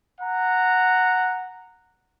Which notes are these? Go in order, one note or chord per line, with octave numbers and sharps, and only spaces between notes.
F#5 A#5